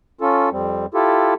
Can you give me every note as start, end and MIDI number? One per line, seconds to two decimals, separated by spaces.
0.21 0.49 61
0.21 0.49 65
0.21 0.49 69
0.52 0.86 41
0.52 0.86 55
0.52 0.86 60
0.94 1.34 64
0.94 1.34 65
0.94 1.34 67
0.94 1.34 69